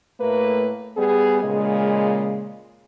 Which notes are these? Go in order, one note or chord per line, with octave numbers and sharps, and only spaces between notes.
A2 A3 A#3 B4
G3 B3 G#4
A#2 C#3 G#3